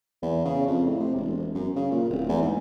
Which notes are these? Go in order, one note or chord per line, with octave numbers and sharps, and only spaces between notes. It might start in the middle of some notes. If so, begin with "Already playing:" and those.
E2
C#3
F2
A2
C3
E1
F#2
C#3
A#2
D1
E2
G#2